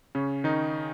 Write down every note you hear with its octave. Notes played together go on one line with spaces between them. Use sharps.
C#3 C#4
D#3 D#4